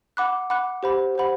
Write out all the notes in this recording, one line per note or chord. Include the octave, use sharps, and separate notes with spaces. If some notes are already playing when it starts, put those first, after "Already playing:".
F#5 B5 D6 F#6
F#5 B5 D6 F#6
G4 C5 F#5 B5
G4 C5 F#5 B5